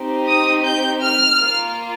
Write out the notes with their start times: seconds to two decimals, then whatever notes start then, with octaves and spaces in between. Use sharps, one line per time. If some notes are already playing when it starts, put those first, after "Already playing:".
Already playing: C4 D#4 G4
0.27 D#6
0.64 G6
1.01 F6
1.39 A#3 F4